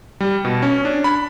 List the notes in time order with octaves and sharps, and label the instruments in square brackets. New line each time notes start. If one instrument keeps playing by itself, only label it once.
[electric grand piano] G3
B2
C#4
D4
B5